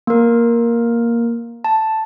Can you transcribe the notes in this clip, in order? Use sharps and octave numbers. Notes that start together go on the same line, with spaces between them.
A#3 A#4
A5